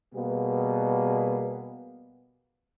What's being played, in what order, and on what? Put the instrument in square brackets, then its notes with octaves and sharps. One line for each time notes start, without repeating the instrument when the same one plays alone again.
[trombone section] B2 G3 A#3 B3 G#4